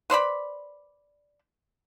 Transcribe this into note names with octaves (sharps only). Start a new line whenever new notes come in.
B4 C5 D5 B5